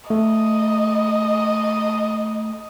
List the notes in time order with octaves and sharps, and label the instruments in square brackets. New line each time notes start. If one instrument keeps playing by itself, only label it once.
[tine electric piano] A3 [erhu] D#5